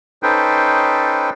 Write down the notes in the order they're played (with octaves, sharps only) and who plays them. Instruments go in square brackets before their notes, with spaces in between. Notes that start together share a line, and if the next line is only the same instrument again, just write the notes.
[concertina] C#4 D#4 A4 B4 C5 G5